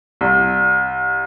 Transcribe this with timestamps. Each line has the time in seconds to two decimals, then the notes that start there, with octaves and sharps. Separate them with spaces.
0.21 C2